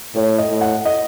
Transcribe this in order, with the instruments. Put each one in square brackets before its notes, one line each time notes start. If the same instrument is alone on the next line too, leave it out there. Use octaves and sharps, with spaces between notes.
[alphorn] A2 [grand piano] C#5
[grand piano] D#5
[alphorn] A2
[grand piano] F#5
D#5